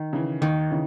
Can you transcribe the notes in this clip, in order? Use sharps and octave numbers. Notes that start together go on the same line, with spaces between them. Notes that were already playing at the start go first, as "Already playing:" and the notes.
Already playing: D#3
C#3 E3
D#2 D#3
C#3 E3